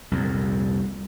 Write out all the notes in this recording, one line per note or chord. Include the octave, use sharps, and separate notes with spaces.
C2 F2 A#2